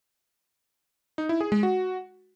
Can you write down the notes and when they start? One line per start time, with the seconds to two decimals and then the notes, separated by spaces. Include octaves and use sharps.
1.18 D#4
1.29 E4
1.41 G#4
1.52 G#3
1.63 F#4